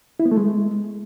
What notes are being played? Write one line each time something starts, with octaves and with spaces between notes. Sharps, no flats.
E4
B3
A3
G#3